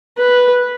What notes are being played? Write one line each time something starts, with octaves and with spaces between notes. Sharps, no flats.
B4